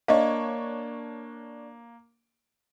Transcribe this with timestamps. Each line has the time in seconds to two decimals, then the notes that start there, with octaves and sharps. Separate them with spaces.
0.08 A#3 D4 C#5 D#5 F5